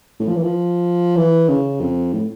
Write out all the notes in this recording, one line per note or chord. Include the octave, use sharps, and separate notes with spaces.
A2
F3
E3
F3
E3
C#3
F2
A2